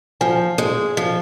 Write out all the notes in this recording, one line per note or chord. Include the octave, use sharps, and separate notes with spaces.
F3 G#5
G#3 D#5
F3 D#5